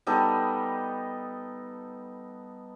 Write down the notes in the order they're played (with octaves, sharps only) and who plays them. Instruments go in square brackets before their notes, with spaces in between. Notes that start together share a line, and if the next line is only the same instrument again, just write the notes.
[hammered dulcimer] G3 B3 D#4 A4